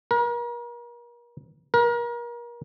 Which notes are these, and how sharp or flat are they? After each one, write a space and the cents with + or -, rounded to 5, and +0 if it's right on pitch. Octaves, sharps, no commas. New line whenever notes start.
A#4 +40
A#4 +35